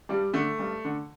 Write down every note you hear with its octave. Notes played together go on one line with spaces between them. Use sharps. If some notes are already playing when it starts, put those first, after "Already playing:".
G2 G3
D3 A3
G2
D3